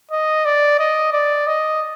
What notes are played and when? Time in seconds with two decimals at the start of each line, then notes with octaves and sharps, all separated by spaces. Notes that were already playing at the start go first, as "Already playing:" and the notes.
0.11 D#5
0.45 D5
0.79 D#5
1.13 D5
1.47 D#5